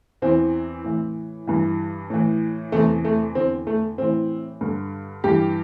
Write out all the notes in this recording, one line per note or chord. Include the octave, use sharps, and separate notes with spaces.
E2 E3 C4
A2 E3
G2 E3
A2 E3
E2 C3 E3 A3
A3
E2 D3 C4
A3
A2 E3 C4
G2 D3
G2 E3 G4